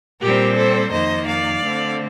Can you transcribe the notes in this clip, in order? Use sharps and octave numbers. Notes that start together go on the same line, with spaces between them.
A#2 G3 C4 G4 A#4
A4 C5
F2 D#3 A#3 C5 D#5
D5 F5
D3 A3 C4